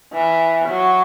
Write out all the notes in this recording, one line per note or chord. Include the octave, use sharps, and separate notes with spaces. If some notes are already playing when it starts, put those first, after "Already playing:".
E3
F#3